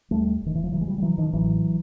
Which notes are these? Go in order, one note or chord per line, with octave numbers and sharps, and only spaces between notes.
D#2 G3 A3
E1
D#3
E3
F3
C#3 E3 F#3
G#3
F3 G3
G3
C#3 E3 F#3
D#3 F3
A1 E3 F#3